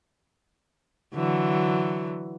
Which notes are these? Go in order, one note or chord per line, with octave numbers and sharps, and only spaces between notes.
D3 E3 F#3